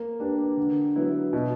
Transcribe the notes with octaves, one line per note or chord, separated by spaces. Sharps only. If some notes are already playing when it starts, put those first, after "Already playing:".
Already playing: A#3
D4 G4 B4
D3
F#3 B3 E4
B2